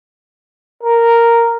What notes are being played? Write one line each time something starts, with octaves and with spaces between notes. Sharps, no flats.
A#4